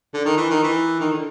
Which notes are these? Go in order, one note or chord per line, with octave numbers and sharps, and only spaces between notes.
D3
D#3
E3
D#3
E3
D#3
D3